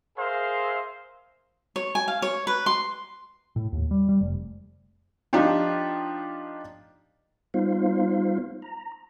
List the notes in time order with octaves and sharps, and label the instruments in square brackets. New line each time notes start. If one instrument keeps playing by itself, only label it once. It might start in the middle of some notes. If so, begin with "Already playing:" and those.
[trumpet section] G#4 A#4 C5 E5 F5
[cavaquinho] C#5
G#5
F5
C#5
B4
C6
[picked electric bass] A2
D#2
G3
G3
F1
[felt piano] F3 D4 D#4 F4 G4
[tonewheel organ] G3 B3 D#4 F4 C5 F5
A#5